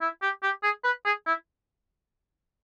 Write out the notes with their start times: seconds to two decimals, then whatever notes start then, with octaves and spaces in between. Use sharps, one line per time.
0.02 E4
0.22 G4
0.43 G4
0.63 G#4
0.84 B4
1.05 G#4
1.27 E4